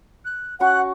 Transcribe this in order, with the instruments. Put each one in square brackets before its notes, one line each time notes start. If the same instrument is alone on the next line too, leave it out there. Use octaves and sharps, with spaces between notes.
[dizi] F#6
[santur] C#4 F#4 C#6 [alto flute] F#5 [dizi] F#6